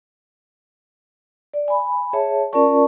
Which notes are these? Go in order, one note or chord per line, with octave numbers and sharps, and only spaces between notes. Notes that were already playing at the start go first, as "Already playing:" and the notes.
D5
G#5 B5
G#4 C#5 E5 A5
C#4 F4 A#4 D5 A5 C#6